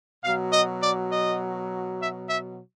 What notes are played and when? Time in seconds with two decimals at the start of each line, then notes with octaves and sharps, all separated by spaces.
0.23 B2 F#3 F5
0.53 D#5
0.82 D5
1.11 D#5
2.00 E5
2.29 E5